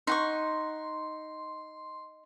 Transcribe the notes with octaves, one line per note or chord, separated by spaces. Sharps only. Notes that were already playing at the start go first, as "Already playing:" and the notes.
D#4 F#5 C6 C#6